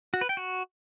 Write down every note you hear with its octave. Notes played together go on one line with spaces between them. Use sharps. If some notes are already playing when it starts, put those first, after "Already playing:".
F#4
B4
G5
F#4